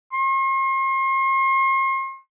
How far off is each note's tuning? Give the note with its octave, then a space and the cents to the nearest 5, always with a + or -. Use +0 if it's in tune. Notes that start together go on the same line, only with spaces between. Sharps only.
C6 +40